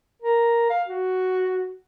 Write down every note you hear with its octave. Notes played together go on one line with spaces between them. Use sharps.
A#4
F5
F#4